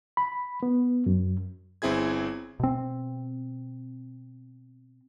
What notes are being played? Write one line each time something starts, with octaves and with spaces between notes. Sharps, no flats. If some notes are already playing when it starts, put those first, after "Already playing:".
B5
B3
F#2
G1 C4 E4 G#4 G#6
B2 C4